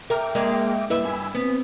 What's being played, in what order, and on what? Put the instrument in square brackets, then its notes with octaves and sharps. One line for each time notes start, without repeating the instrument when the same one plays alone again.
[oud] A#4 [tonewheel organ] E5 G5 D6
[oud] G#3 A#3 D4
[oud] G2 B4 E5 [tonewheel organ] A#3 E4
[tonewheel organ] G#5 B5 E6
[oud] B3 [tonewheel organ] C4